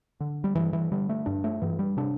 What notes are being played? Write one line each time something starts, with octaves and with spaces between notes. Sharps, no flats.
D3
G3
G2 E3
E3
D3 G3
A3
G2 D4
A3
G2 E3
G3
C3 D4